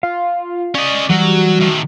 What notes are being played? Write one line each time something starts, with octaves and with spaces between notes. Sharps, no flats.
F4 F5
C#4 D5 D#5
E3 F#3 G3 F#4 G4
A2 D#3